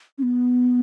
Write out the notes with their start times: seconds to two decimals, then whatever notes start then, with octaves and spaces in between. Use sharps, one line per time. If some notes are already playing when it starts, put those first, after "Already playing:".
0.18 C#4
0.23 B3